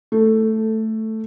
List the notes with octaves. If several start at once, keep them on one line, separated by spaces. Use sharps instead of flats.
A3